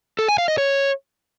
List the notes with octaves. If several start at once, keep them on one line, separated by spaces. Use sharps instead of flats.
A4
G#5
F5
D#5
C#5